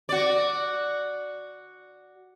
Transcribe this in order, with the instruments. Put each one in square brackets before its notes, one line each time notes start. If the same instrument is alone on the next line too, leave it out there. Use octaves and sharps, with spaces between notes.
[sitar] F#4 D5